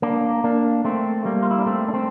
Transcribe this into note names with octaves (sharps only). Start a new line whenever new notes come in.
A#3 D4
A#3 D4
A3 C4
G3 A#3
F4
E4
D4
A3 C4
D4
A3 C4